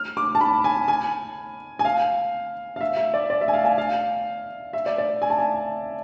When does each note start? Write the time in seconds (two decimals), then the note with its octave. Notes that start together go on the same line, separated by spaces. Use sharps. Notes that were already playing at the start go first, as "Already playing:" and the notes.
Already playing: F6
0.17 D6
0.35 A5
0.41 B5
0.64 G#5
0.88 G#5
1.79 G#5
1.85 F5
2.76 F5
2.81 E5
2.97 E5
3.14 D5
3.30 D5
3.41 E5
3.48 G#5
3.53 F5
3.65 G#5
3.78 F5
4.73 E5
4.86 D5
4.98 D5
5.22 G#5
5.30 A5
5.38 G#5